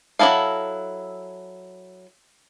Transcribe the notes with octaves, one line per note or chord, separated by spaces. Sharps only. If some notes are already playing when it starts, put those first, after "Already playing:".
F#3 C#4 E4 A4 F5